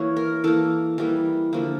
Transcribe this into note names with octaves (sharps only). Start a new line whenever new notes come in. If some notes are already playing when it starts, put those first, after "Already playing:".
Already playing: E3 A#3 C#5
A#4
E3 A#3 A4
E3 G3 A#3
D3 F3 A#3